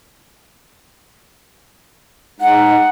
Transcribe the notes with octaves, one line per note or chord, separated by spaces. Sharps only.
G#3 D#4 F#5